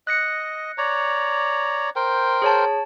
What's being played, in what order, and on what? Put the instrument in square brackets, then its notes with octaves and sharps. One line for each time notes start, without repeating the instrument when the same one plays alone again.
[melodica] D#5 [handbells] F#6 A#6 C#7
[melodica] C#5 D5 A#5
A#4 C5 G5
[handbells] G#4 C#5 A5